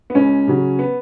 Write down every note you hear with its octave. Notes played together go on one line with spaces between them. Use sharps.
B3
C#2 C#4
C#3 F#3
B3